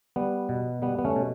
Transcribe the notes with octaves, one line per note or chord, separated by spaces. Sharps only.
G3 B3
B2
G3 B3
B3
A3 C#4
B2